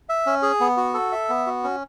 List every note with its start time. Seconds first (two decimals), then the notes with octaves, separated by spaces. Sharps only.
0.09 E5
0.26 C#4
0.43 G#4
0.60 B3
0.77 F#4
0.94 A4
1.12 E5
1.29 B3
1.47 F#4
1.64 C#4